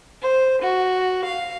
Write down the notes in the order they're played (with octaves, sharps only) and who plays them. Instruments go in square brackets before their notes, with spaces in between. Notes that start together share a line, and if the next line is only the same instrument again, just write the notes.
[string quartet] C5
F#4
F5